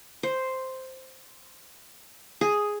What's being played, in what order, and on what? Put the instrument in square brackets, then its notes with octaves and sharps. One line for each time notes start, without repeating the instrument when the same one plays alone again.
[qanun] C5
G#4